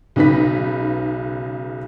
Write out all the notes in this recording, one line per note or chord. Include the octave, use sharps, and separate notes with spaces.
B1 C#3 D#4 B4 B6